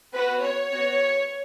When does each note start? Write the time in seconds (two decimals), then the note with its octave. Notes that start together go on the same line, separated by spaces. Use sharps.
0.13 B3 F#4 B4
0.42 C#5
0.71 B3 F#4